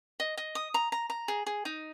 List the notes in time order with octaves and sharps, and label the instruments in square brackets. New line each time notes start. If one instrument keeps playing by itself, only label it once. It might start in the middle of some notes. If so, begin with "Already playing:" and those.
[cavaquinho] D#5
D#5
D#6
A#5
A#5
A#5
G#4
G#4
D#4